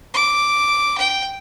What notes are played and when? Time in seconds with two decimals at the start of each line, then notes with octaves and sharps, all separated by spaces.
0.14 D6
0.98 G5